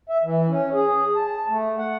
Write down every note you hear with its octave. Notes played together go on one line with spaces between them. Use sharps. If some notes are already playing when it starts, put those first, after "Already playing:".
E5
E3
C#4
G#4
A5
A3
F#5